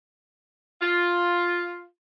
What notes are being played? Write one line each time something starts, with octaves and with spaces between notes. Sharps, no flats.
F4